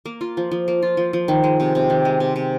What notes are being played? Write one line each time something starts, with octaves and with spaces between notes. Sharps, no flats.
A#3
F4
F3
F3
A#3
F4
F3
F3
D#3
G#3
C3
C3
D#3
G#3
C3
C3